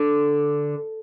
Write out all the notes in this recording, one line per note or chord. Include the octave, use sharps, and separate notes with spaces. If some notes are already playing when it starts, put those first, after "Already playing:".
Already playing: D3